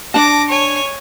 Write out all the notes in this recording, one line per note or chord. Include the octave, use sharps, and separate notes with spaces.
D4 D5 A5 D6 A#6
C#5 G#5